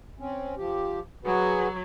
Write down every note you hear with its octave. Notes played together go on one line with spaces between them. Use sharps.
C4 C#4
F3 G4
F#3 F#4 G#4 B4